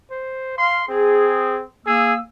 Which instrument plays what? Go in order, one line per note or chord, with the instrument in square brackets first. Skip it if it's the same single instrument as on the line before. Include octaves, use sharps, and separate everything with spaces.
[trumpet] C5
[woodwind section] F5 [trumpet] C6
[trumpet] C4 [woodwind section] G#4
[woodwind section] A#3 E6 [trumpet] G#4